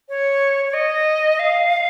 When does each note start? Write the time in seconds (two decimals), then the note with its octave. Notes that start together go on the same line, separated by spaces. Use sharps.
0.09 C#5
0.65 C#5
0.73 D#5
1.39 F5